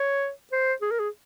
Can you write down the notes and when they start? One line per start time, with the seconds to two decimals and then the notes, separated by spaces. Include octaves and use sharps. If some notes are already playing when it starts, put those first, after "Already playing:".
Already playing: C#5
0.52 C5
0.82 G#4
0.91 A#4
0.99 G#4